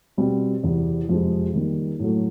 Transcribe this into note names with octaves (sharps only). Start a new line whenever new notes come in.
B2 G3 C4
E2 C3 E3
F2 C3 F3 G#3
D#3 G3 A#3
A2 F#3 A3